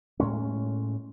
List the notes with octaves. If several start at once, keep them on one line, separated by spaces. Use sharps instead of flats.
A2 G#3 C#4